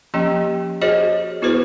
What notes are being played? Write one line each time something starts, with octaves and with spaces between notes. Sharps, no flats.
F3 A#3 C#4 G4 D#5 G5
F#4 G#4 C5 C#5 D#5
B3 E4 F#4 G#4 B4 C5